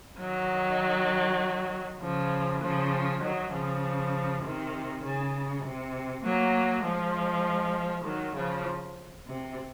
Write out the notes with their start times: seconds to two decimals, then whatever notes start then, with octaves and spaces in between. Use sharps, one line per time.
0.19 D#3 F#3
2.01 C#3 F3
2.61 C#3 F3
3.22 D#3 F#3
3.53 C#3 F3
4.44 C3 D#3
5.03 C#3
5.65 C3
6.24 F#3 A#3
6.85 F3 G#3
8.06 D#3 F#3
8.36 C#3 F3
9.27 C3